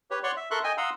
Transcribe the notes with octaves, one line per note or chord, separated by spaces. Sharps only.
G4 B4 C#5
C#5 D5 F#5 C6 C#6
E5
A4 A#4 E5 C6 C#6 F#6
D#5 G5 G#5
F5 F#5 A#5 C6 D#6 E6